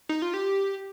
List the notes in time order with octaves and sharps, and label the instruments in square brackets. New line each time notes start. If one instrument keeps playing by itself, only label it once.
[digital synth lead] D#4
F4
G4